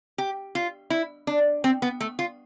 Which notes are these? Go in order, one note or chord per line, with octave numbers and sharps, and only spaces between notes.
G4
F4
E4
D4
C4
B3
A3
F4